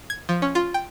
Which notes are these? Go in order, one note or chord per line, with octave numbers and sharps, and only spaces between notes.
G#6
F3
C#4
F4
G5